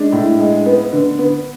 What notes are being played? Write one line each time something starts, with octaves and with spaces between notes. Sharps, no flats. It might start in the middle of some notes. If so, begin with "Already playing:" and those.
Already playing: G#3 D4
A2
G#3
B3
D3
B3